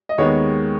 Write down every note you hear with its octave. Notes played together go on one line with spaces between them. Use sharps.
D#5
D#2 D#3 G#3 B3 C#5